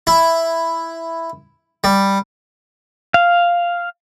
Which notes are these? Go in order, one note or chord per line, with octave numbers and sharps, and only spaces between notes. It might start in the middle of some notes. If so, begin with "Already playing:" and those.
E4
G3
F5